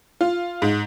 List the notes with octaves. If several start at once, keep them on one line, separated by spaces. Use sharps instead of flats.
F4
G#2